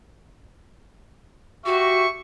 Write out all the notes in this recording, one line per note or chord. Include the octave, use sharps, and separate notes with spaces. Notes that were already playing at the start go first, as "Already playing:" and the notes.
F#4 G4 E5 C#6